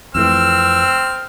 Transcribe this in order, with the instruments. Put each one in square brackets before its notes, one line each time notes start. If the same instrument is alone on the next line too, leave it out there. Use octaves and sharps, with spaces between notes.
[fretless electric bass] F2 E3 A3 [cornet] C4 [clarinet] E6 [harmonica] F6